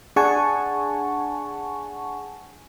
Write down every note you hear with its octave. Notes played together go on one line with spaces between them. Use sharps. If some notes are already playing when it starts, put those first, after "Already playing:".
D4 G#4 F#5 G#5 A5 C#6